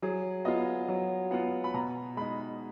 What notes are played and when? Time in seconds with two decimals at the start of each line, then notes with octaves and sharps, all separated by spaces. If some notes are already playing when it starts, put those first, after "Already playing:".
0.02 F#3 G#4
0.45 B3 F4 D#5
0.88 F#3
1.31 B3 F4 F#5
1.64 B5
1.74 B2 A#5
2.17 G#3 D#4 B5